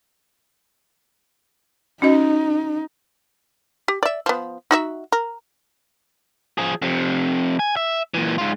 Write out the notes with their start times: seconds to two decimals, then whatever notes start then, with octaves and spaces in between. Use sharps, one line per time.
2.02 C#4 D#4 F#4 D#5
3.88 G4
4.03 D5 E5
4.26 F3 B3
4.71 D#4 F#4 E5
5.12 A#4
6.58 F3 G#4
6.82 F2 C3
7.59 G#5
7.76 E5
8.14 A#2 E3
8.38 G#2 F4